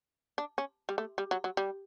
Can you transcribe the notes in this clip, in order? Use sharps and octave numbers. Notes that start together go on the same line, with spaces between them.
D4
C#4
G3
A3
G3
F#3
F#3
G3